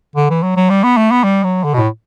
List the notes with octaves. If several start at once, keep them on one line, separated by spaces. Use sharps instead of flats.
D3
E3
F#3
F#3
G3
B3
A3
B3
G3
F#3
D3
B2
A2